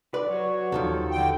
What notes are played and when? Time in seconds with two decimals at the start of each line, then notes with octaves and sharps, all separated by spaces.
0.14 B4 D5
0.28 F#3 F#4 C#5
0.72 D#2 D#3 F3 A4
1.11 D3 G5